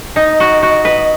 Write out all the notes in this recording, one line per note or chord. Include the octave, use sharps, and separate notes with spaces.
D#4 D#5
F#4
F#4
B4